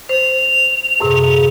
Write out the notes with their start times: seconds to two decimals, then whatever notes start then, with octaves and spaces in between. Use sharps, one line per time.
0.09 C5 F7
1.00 F#2 A2 C3 G#4